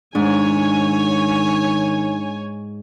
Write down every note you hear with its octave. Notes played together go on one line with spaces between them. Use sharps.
G#2 D#3 D4 C#5 G#5